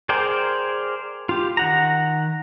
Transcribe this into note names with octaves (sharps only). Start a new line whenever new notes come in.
G#4 A#4 C5 D5 G5
F4 G4
D#3 F#5 A#5